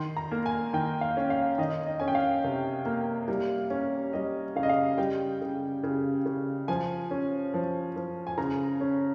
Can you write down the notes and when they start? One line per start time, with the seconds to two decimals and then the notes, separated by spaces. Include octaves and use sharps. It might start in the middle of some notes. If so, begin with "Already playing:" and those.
Already playing: D#3 C6
0.17 A#5
0.32 A#3
0.46 G#5
0.73 D#3 G5
1.01 F5
1.17 C#4
1.30 F5
1.58 D#3 D#5
1.86 D#5
2.00 C#4 G#5
2.08 G5
2.15 F5
2.44 C3
2.86 A#3
3.28 G3
3.70 C#4
4.13 G3 D#5
4.56 C#3 F5
4.63 D#5
4.69 F5
4.98 G3 G5
5.41 C#3
5.83 C#3
6.25 C#3
6.68 F3 G#5
7.11 C#4
7.54 F3
7.96 F3
8.27 G#5
8.38 C#3 A#5
8.81 C#4